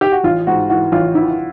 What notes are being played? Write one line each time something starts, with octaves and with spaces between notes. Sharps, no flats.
G4
F#4
A1 F4
G#2 F#4
E3 F#4
A1 F4
E3 E4